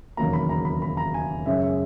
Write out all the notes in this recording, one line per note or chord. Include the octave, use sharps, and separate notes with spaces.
E1 D#2 C#3 F#3 A#3 A#5
B5
A#5
B5
B5
A#5
G#5
F#2 C#3 G#3 C#4 E5
E5